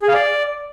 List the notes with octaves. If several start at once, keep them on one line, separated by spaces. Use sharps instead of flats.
G#4
F5
D5